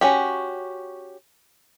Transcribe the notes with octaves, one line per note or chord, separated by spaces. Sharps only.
C#4 F#4 G4